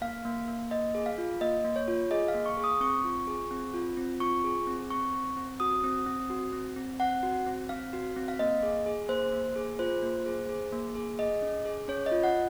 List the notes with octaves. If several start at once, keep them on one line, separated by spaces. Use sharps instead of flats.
A#3 F5
A#3
A#3
A#3 D#5
G#4
F5
F4
A#3 D#5
A#3
C#5
F4
G#4 D#5
F5
A#3
C#6
G#4
D#6
C4 C#6
F4
G#4
C4
F4
C4
F4 C#6
G#4
C4
C4 C#6
C4
C4
F#4 D#6
C4
C4
F#4
C4
C4
C4 F#5
F#4
C4
C4 F5
F#4
C4
F5
A#3 D#5
G#4
G#4
A#3 C5
A#3
G#4
F4 C5
A#3
G#4
G#4
A#3
G#4
G#4 D#5
C#4
G#4
C#4 C#5
D#5
F4
F#5